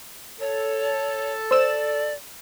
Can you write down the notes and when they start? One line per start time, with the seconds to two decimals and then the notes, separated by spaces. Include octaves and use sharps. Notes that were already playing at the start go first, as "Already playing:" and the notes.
0.40 A4 C#5
1.51 C5 D5 E6 E7